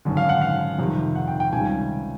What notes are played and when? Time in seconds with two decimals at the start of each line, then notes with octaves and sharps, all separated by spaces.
0.05 G#1 F#2 D3
0.17 F5
0.29 F#5
0.41 F5
0.79 F2 C3 D#3 G3
1.16 F#5
1.28 G5
1.40 G5
1.52 C#2 C3 D#3 G3 G#5